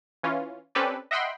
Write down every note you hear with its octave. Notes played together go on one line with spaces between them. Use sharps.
E3 C#4 F4
C4 C#4 G4 A4 B4 D5
D#5 E5 F#5 G5 B5 C6